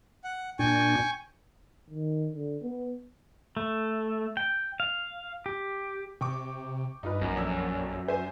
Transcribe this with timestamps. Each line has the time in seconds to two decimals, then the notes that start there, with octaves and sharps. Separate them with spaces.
0.24 F#5
0.59 A#2 D4 G5 G#5 C#6
1.90 D#3
2.33 D3
2.62 B3
3.57 A3
4.37 G5
4.80 F5
5.46 G4
6.21 C3 G5 C#6 D6
7.03 G2 D#4 F4 B4
7.21 A#1 F#2
7.37 F2 D4 E6
8.08 C5 E5 G#5